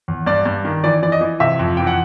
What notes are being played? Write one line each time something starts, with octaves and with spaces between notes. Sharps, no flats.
E2
G2 D5
G2
D#3
E3 D5
E3 D5
D#5
E3
C3 E5
F2
E3 G5
F#5